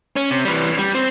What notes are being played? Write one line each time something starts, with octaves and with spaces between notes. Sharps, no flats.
C#4
C3
E3 G3
G3
C4